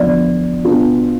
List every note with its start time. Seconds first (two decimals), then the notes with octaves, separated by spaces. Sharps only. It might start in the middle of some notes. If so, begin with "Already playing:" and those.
Already playing: E2 D3 F3 B3 D4 D5
0.64 B2 B3 D4 F4